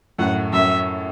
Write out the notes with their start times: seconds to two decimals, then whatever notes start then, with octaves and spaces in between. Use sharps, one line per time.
0.19 F#2 A2 F#5
0.53 F#2 E5